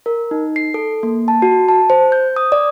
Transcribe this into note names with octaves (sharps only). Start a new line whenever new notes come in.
A#4
D#4
C7
A4
A#3
A5
F#4
A5
C5
G6
D#6
D5